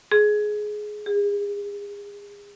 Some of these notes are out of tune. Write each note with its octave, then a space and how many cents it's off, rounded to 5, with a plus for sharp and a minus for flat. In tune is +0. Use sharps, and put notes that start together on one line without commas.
G#4 +15
G#4 -35